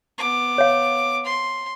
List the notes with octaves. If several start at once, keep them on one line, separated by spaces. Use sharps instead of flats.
B3 D6
C#5 F5
C6